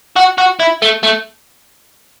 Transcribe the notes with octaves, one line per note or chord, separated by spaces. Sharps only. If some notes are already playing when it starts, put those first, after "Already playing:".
F#4
F#4
E4
A3
A3